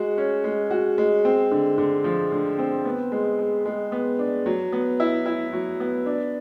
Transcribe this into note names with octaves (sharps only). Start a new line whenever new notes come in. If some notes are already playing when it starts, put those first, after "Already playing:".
Already playing: G#3 F#4
C#4
G#3
F#4
G#3
C4
D3
D3
F3
D3
C4
B3
G#3
G#3
G#3
B3
D4
F#3
B3
E4
E4
F#3
B3
D4